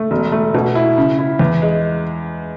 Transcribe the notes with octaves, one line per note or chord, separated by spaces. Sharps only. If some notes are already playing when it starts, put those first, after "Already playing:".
Already playing: A3
E1
A3
B2
E4
C#3
E4
E2
G#3